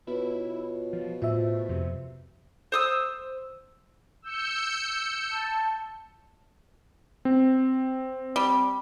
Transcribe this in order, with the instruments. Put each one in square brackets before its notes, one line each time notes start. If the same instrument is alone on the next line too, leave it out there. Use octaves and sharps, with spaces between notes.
[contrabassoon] B2 [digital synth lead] E4 [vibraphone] F4 B4 C#5
[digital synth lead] F3
[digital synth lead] A2 [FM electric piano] F4 E5 [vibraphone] C5
[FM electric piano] F2 [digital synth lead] C3
[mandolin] C5 D#6 E6
[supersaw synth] E6 G6 C#7
[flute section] A5
[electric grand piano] C4
[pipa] G3